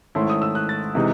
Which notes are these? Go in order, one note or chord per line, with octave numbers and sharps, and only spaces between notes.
G#2 D#3 A3 C#4 E4 C6
D#6
E6
F#6
A6
C3 E3 G#3 D#4